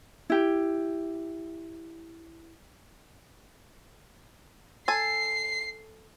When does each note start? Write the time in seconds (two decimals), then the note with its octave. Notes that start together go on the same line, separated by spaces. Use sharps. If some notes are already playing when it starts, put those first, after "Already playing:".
0.30 E4 G4
4.88 A4 G#5 C7